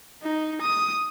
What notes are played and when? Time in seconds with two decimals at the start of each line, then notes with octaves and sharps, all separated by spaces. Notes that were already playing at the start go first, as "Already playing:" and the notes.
0.23 D#4
0.62 D#6